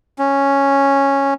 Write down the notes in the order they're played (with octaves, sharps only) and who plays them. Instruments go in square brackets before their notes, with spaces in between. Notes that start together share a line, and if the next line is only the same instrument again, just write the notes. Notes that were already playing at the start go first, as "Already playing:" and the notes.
[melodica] C#4